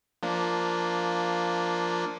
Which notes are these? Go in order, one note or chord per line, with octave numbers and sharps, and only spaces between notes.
F3 A#3 D4